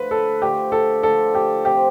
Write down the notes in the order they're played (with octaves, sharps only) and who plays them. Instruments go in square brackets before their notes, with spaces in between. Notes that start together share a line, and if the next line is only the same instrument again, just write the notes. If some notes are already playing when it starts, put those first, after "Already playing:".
Already playing: [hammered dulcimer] D3 F3 A3 [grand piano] B4
[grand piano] A4
[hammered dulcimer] D3 F3 A3 [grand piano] G4
[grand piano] A4
[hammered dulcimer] D3 F3 A3 [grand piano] A4
[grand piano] G4
[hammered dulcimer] C3 F3 C4 [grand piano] G4